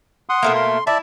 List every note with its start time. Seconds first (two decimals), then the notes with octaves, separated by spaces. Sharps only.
0.29 F#5 C6 D#6
0.43 B2 A3 A#3
0.55 C6
0.87 E4 D5 E5 A5